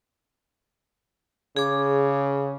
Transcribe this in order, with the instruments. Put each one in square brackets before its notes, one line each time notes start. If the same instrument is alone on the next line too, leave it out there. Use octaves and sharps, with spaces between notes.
[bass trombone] C#3 [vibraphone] G#4 D6